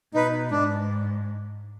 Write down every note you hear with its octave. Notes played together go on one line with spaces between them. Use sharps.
B2 D#4 B4
G#2 D4